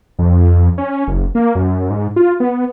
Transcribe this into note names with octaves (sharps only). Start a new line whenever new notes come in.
F2
C#4
F#1
A#3
F#2
G#2
F4
B3